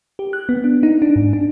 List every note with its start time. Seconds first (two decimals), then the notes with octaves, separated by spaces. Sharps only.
0.19 G4
0.33 F#6
0.49 B3
0.64 D4
0.83 D#4
1.02 D4
1.16 G#2
1.33 D4